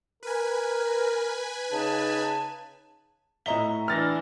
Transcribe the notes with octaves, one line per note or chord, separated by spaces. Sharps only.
A#4 B4 G#5
C#3 D#4 A5
A2 D#5 E5 A#5 C#6 G7
E3 D4 F6 A6 A#6